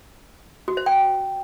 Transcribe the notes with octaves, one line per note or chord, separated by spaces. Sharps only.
F#4
C5
G5